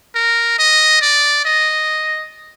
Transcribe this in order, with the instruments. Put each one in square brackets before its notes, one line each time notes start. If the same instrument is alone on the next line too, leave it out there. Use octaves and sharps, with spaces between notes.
[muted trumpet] A#4
D#5
D5
D#5